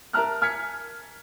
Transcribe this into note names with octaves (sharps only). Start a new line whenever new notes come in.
A#4 E5 A5 A#5 F6 F#6
G#5 F6 G#6 B6 C#7